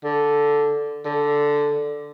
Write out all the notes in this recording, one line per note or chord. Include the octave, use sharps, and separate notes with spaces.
D3
D3